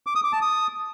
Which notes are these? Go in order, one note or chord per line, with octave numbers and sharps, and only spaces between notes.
D6
D#6
D6
A5
D#6